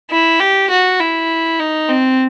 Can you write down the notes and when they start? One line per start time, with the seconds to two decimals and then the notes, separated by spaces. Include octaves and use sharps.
0.11 E4
0.40 G4
0.70 F#4
1.00 E4
1.60 D#4
1.89 C4